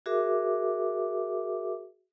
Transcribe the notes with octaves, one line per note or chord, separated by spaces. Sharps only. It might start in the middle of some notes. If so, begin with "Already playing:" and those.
F#4 G#4 A#4 E5 D6